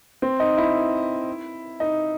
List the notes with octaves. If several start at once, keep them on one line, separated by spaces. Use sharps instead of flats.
C4
D#4
E4
D#4